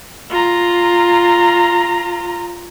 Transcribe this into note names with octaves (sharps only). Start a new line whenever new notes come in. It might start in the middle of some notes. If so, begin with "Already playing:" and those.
F4 A#5